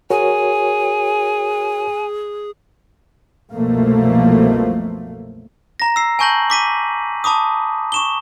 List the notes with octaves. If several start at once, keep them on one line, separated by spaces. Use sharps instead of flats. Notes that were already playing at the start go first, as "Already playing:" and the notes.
F#4 G#4 A#4 C#5 G#5
C2 F#2 B2 F3 A3 A#3
A#5 A#6
E6 C7
G#5 A5 C#6 G6 A#6 F#7
D6 B6 D#7
A5 B5 D6 D#6
C#6 E7 G7